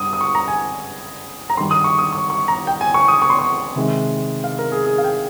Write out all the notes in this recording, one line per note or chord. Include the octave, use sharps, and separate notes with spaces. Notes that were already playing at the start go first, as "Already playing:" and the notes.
Already playing: G2 G3 D#6
D#6
C#6
A#5
G#5
A#5
G2 D#3 G3 C6
D#6
C#6
D#6
C#6
C#6
A#5
G5
G#5
C#6
D#6
C#6
C6
C#6
C3 D#3 G#3
F5
A#4
G#4
G#4
F5
G5